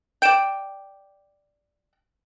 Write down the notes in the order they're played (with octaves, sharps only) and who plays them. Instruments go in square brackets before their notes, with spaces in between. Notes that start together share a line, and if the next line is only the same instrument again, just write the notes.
[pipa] D5 G5 [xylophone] G6 D7 E7